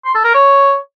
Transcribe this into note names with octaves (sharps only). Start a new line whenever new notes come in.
C6
A4
A#4
C#5